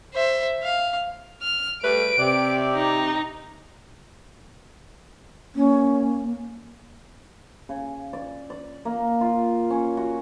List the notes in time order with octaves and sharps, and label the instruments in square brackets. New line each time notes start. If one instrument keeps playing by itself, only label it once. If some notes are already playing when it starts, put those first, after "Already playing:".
[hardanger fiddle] C5 E5
F5
[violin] F6
[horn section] G3 A3 [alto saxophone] B4 [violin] D7
[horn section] C3 [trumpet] G4 [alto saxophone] D5
[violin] D#4
[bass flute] A#3 [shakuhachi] C#4
[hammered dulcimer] C#3
D5
D5
A#3
F4
C#4
F#4